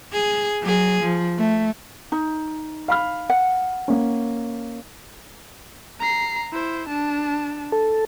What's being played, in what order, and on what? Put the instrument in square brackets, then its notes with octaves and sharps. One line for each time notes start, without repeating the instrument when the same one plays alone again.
[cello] G#4
F#3 G#4
F3
A3
[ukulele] D#4
[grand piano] F5 B5 F6
[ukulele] F#5
[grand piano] A#3 C#4
[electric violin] A#5 C7
E4 C5
D4 A5
[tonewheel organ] A4